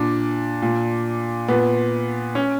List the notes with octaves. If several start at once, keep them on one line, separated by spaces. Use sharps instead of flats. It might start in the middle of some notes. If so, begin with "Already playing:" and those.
Already playing: A#2 D4
A#2
A#2 B3
C#4